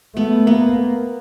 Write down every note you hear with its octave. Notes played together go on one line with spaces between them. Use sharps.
A3 B3
A#3 B3